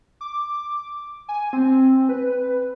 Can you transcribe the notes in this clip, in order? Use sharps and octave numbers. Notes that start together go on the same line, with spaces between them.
D6
G#5
C4
B4